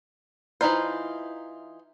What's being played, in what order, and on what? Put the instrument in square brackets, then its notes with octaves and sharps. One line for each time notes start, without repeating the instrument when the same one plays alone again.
[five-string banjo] E3 F3 D#4 F4 C5